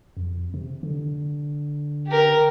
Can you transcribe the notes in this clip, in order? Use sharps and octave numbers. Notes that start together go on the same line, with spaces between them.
F2
C3
D3
G4 A#4